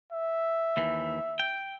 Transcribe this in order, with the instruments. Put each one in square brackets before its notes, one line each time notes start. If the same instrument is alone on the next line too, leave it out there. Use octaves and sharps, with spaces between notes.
[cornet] E5
[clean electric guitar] D#2 E3
G5